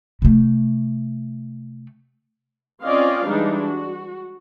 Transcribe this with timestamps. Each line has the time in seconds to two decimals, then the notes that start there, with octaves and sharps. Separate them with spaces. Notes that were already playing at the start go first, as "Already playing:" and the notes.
0.22 C3 A3
2.83 C4 C#4 F4 D5 D#5 F5
3.28 E3 G3 G#3 D4 D#4
3.60 F#4